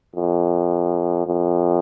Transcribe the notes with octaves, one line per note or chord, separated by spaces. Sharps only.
F2
F2